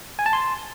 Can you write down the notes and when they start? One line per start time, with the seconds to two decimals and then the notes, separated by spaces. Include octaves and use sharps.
0.19 G#5
0.26 A5
0.33 C6